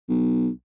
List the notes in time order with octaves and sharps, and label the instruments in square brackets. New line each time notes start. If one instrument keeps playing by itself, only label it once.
[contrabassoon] B1